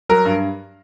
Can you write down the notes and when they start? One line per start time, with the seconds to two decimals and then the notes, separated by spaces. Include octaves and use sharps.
0.09 F#3 A#4
0.25 G2